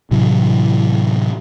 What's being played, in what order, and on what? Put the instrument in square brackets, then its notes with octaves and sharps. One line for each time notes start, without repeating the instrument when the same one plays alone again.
[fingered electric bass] A2 C3 E3 F#3